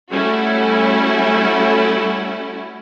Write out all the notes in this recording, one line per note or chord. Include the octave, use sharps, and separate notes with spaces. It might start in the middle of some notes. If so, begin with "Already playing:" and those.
G3 A3 C#4 E4 F#4